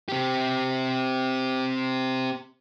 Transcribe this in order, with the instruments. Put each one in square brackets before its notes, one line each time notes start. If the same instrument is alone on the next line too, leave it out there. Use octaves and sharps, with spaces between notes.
[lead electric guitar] C4 G4